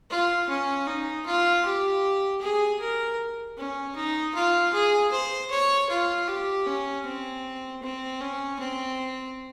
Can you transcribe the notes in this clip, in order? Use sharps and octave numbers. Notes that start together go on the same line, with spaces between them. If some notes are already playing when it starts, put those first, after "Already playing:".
F4
C#4
D#4
F4
G4
G#4
A#4
C#4
D#4
F4
G#4
C5
C#5
F4
G4
C#4
C4
C4
C#4
C4